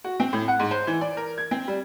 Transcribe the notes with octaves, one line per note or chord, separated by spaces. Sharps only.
F#4
C4
A2
F#5
G#2
C5
E3
D5
A#4
G#6
C4
G3